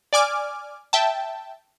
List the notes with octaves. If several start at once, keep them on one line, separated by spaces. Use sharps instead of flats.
D5 G#5 D6 F6
E5 G5 A5